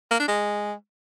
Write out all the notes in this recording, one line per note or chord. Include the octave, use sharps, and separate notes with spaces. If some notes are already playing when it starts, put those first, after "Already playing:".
A#3
D4
G#3